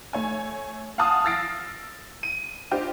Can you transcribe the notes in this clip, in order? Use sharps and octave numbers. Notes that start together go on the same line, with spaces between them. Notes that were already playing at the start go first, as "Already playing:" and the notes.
A3 C#5 G#5
F5 F#5 G#5 A5 D#6
E6 F6 A6 A#6 C7 D7
D#7
D4 F4 G4 C5 D#5